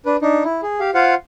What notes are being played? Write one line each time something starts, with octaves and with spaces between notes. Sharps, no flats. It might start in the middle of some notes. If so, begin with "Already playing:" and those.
D4 B4
D4 D#4
E4
G#4
G4 F5
F4 C5 F5 F#5